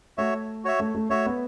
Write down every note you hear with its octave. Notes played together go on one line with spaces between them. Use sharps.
A3 F#4 C#5 E5
F#4 C#5 E5
A3
A3
A3 F#4 C#5 E5
B3